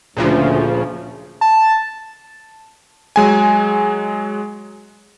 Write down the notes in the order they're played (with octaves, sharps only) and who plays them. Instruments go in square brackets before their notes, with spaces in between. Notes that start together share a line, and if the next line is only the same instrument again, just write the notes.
[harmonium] D2 [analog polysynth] A#2 C#3 F3
[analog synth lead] A5
[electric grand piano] F#3 G#3 G#5